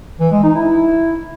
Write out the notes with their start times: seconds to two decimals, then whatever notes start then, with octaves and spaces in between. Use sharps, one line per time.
0.20 E3
0.32 G#3
0.43 D#4
0.55 E4